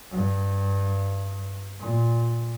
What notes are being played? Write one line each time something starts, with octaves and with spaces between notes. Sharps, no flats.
G2
A#2